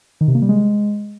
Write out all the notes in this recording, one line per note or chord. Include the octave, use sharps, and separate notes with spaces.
D#3
C3
A#3
G3
G#3